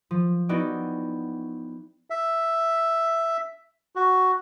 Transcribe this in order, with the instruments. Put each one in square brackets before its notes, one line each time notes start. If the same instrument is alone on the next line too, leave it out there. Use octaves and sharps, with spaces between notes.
[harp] F3
B3 D#4 E4 F#4 D5 G5
[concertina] E5
F#4